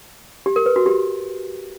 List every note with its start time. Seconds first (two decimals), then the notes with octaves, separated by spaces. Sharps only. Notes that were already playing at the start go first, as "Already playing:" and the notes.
0.46 G4
0.56 A#4
0.66 B4
0.76 F#4
0.86 G4